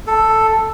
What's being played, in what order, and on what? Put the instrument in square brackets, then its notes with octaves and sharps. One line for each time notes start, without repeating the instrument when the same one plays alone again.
[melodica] A4